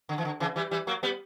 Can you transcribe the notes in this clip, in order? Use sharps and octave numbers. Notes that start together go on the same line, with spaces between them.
D3
E3
D3
C#3 E3
E3 G3
E3 G3
F#3 A#3
G3 B3